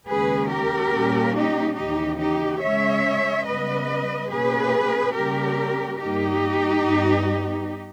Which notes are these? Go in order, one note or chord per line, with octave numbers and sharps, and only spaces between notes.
D#2 C#3 G#3 C#4 G#4 B4
G4 A#4
A#2 G3 A#3 C#4
D#4 G4
D#2 C#3 E3 D#4 G4
D#4 G4
C#3 G#3 C#4 C#5 E5
C#3 G3 B3 B4 D#5
B2 A#3 C#4 G#4 B4
C#3 G3 A#3 C#4 G4 A#4
G2 G3 A#3 D#4 G4
G2 G3 B3